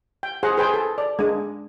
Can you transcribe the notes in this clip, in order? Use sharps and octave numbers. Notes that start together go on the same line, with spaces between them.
G5
G#4 C5 F#5 A#5
G#4 B4 C5 G5 G#5
A4
D5
G#3 D4